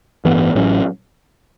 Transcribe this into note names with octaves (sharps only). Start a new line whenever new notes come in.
A1 G2 E3 B3
A1 A2 F#3 C#4